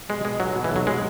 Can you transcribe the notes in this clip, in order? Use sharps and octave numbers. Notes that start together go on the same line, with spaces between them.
B2 G#3
B2 G#3
B1 F#3
B2 F#3
E3
B1 F#3
B2 G#3